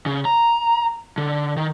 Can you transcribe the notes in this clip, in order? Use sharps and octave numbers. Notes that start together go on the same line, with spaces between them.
C#3
A#5
D3
D#3